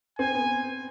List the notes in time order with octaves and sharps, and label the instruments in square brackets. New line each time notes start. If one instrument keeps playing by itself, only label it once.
[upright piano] C4 [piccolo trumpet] G#5
[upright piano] B3